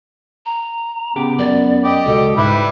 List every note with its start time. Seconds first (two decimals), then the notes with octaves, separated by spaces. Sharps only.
0.46 A#5
1.16 C#3 B3 G4 D6
1.39 F#2 D5
1.84 G4 D5 D#5
2.05 C#2 B2 A4
2.37 G#2 G3 E4 B4 E5